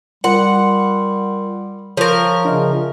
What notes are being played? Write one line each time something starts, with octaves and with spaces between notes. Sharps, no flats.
G3 F4 A#4 F#5 C6
F3 A#4 C#5 C#6
C#3 D4 D#5 E5